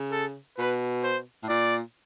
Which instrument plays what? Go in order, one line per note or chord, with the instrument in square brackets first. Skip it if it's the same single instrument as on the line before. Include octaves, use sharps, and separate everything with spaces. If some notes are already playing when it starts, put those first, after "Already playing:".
Already playing: [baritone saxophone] C#3
[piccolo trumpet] A4
[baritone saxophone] B2 [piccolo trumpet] B4
[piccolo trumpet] C5
[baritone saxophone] A2
[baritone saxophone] A#2 [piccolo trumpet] D5